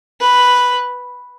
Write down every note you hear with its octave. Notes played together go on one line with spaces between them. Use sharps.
B4